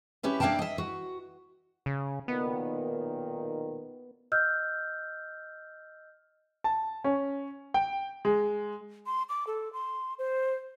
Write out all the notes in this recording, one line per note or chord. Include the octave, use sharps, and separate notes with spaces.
C#4 G4 B4 E5
A#3 D4 E5 F5 G5 A5
D#5 E5
F#4
C#3
B1 A#2 D#3 B3
D#5 E6 F6 G6
A5
C#4
G5
G#3
C6
D6
A4
C6
C5